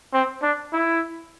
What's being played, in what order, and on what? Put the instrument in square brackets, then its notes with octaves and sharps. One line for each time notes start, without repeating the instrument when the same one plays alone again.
[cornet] C4
D4
E4